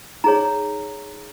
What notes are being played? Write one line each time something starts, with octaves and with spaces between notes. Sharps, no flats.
D#4 G#4 C#5 A#5